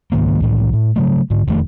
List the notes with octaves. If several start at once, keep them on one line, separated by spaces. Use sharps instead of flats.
C#2 G#2 D#3 A#3
C2 A2 E3
A2
C#3 F#3 A3
G#2 D3
E1 F2 D#3 A3